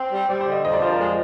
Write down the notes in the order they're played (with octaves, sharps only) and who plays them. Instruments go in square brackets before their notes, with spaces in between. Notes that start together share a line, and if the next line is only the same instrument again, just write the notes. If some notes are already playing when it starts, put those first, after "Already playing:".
Already playing: [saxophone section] C4
G3
[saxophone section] G3 [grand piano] D5
[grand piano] C5
[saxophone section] D3
[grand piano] D#5
[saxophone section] F2 [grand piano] D#5
[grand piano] D5
[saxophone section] F3 [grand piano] C5
[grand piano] A#4
[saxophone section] G#3